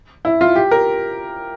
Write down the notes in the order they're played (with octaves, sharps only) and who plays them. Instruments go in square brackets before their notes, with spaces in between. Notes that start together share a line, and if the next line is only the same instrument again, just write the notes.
[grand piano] E4
F4
G4
A#4